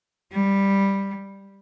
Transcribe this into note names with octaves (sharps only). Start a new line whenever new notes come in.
G3